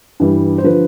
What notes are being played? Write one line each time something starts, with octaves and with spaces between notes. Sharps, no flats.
G2 E3 G3
C5
D3 F3 B4